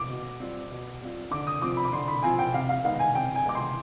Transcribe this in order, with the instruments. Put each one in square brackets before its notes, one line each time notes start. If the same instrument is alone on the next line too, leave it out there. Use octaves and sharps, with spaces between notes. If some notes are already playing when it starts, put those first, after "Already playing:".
Already playing: [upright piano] D6
[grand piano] B2
G3 C4 F4
B2
G3 C4 F4
[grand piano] D3 [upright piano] D6
[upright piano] D#6
[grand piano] F3 C4 F4 [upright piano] D6
[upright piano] B5
D6
[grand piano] D3 [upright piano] C6
[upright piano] B5
[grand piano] F3 C4 F4 [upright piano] G#5
[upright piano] G5
[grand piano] C3 [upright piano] F5
[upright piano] F5
[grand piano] D#3 G#3 B3 D#4 [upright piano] F5
[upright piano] G#5
[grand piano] C3 [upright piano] G5
[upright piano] G#5
[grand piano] D#3 G#3 B3 D#4 [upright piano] D6
[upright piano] C6